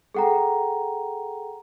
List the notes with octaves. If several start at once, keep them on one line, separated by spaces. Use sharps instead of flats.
G#4 A4 F#5 G5 A#5